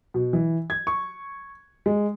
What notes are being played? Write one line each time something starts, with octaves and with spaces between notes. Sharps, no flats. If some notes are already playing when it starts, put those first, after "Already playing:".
B2
E3
G#6
C#6
G#3